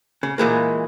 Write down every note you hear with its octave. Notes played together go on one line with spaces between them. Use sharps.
C#3
A#2 E3 G#3 A#3